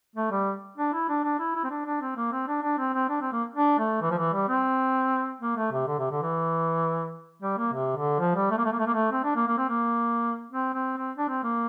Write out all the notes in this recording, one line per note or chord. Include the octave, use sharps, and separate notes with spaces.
A3
G3
D4
E4
D4
D4
E4
E4
C4
D4
D4
C4
A#3
C4
D4
D4
C4
C4
D4
C4
A#3
D4
A3
E3
F3
E3
G3
C4
A#3
A3
C3
D3
C3
D3
E3
G3
A#3
C3
D3
F3
G3
A3
A#3
A3
A#3
A3
A#3
A3
C4
D4
A#3
A#3
C4
A#3
C4
C4
C4
D4
C4
A#3